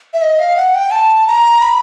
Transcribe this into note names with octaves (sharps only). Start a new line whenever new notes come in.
E5
D#5
F5
F#5
G5
A5
A#5
B5